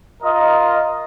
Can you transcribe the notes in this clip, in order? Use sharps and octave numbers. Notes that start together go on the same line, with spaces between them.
F4 A#4 D#5